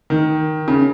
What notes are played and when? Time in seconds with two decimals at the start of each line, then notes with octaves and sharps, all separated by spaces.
0.10 D#3
0.68 C#3